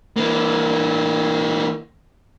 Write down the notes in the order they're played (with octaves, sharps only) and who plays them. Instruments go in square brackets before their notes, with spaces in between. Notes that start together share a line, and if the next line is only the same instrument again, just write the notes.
[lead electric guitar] E3 A#3